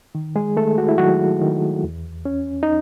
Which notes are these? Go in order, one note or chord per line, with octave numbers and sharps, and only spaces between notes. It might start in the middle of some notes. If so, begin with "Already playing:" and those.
D#3
G#3 G#4
D#3 A3 A4
F#4
E4
D#3 F#3 F#4
D#3
E2
C#4
D#4